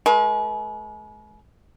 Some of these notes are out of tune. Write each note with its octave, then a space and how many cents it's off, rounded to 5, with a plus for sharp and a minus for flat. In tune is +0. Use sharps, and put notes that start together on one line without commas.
G#3 +40 B4 -45